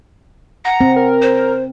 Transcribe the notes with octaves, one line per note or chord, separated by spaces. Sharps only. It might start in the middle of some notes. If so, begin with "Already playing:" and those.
F#5 A#5
C4
A#4
C5